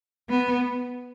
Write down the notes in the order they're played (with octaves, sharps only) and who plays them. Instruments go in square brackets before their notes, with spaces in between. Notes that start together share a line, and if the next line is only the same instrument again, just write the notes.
[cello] B3